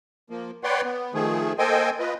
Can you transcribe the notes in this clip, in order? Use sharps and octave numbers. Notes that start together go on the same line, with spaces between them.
F3 A#3
B4 C#5 D5 F#5 G5 C6
B3
D#3 F3 A3 G#4
A#3 A4 C5 D#5 G5 G#5
F4 B4 D#5